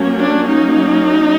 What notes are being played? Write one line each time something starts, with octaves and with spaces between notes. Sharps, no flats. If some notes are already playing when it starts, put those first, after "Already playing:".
Already playing: F#3 A#3 C#4
D4
D#4